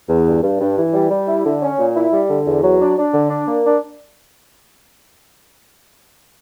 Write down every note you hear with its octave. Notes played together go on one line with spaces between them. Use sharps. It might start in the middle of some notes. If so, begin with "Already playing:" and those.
E2
G2
G2
G2
E3
G3
G3
E4
D3
C#4
A#2
E4
G3
D3
E2
F#3
D4
D4
D3
D4
A#3
D4